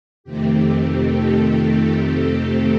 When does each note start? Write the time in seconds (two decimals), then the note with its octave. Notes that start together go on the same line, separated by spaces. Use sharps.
0.24 F2 C3 D#3 A3 C4 G4
1.18 A4